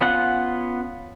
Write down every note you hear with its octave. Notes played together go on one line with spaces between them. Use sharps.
B3 C#4 F4 F#5